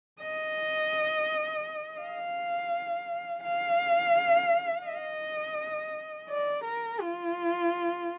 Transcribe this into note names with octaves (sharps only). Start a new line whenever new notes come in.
D#5
F5
F5
D#5
D5
A#4
F4